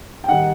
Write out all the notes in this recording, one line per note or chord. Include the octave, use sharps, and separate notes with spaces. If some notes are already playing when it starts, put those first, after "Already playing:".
G5
D#3 G3 D#4 F#5